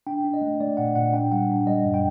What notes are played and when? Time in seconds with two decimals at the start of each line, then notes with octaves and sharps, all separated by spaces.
0.07 D4 G5
0.24 D4
0.34 D#5
0.41 A3
0.60 A3 D5
0.77 A#2 F#5
0.95 A#2 F#5
1.13 D4 G5
1.32 G3 F#5
1.50 D4
1.67 G3 D#5
1.85 F#2
1.94 G5